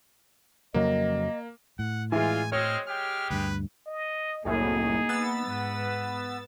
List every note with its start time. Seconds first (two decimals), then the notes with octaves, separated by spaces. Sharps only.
0.74 F2 C#3 F#3 A#3 D#5
1.79 A2 F#5
2.12 E3 G#3 F4 G#5
2.52 G#3 C4 C#5 D#5 F6
2.87 G#3 G4 F6
3.30 D2 G2 B4
3.87 D#5
4.45 C2 F#2 A2 A#3 D#4 G#4
5.09 B3 E6 A6
5.46 G#2 B4